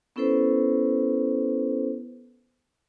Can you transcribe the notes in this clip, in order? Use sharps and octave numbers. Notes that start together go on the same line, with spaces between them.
B3 C#4 E4 A4 B4 C5